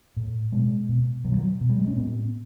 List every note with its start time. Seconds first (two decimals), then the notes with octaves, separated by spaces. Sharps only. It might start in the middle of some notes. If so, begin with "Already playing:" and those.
0.17 A2
0.52 B2 G#3
0.89 B2
1.24 B2 F#3
1.32 F3
1.37 F#3
1.61 B2
1.69 G3
1.78 G#3
1.87 C#4
1.96 A2 B3